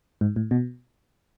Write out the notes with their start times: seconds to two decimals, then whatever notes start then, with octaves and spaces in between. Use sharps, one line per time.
0.21 G#2
0.36 A2
0.51 B2